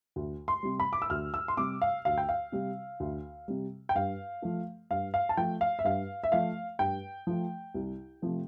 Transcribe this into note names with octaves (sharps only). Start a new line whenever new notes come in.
D2
C6
C3 G3
B5
D6
E6
D2 F6
E6
C6
C3 G3 D6
F5
D2 F5
G5
F5
C3 G3
D2
C3 G3
G5
G2 F5
F3 A3
G2 F5
F5
A5
F3 A3 G5
F5
E5
G2 F5
E5
F3 A3 F5
G2 G5
F3 A3
C2
C3 F3 A3